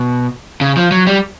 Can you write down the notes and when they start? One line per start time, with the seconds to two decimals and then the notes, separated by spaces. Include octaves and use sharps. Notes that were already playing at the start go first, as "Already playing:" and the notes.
Already playing: B2
0.61 C#3
0.77 F3
0.91 F#3
1.07 G3